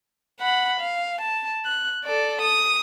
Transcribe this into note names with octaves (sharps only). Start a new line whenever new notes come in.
F#5 B5
F5
A5
F#6
A4 D5
D#6